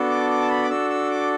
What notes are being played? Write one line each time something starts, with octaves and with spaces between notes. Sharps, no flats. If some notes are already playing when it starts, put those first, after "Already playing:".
Already playing: B3 D4 F#4 A4
D6
D6
A5
B5
D6
D4 F#4 A4 E6
E6
D6